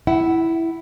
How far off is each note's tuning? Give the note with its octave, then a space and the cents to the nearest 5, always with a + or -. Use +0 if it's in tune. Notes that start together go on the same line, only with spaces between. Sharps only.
E4 +0 F#5 +25